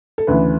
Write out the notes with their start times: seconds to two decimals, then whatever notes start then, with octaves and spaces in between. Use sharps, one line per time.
0.18 A4
0.27 D2 C#3 E3 B4